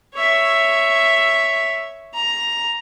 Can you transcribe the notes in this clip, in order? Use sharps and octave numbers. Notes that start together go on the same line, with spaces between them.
C#5 E5
A#5